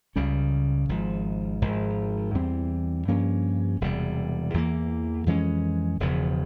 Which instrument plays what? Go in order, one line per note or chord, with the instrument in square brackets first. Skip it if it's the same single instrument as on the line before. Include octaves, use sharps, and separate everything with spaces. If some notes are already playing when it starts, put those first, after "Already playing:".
[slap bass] C#2 C#3 G3 C#4
G#1 G#2 F3
G#1 G#2 F3
E2 E3 G3 C4
G2 F3 A#3 C#4
E1 E2 C3 G3
E2 E3 A#3
F2 E3 G#3 C#4
E1 E2 C#3 F3